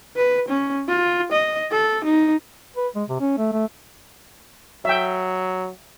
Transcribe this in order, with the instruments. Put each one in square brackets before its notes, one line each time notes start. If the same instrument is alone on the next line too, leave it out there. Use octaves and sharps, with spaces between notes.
[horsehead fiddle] B4
C#4
F4
D#5
A4
D#4
[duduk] B4
G#3
C3
C#4
A3
A3
[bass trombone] F#3 [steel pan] E5 G5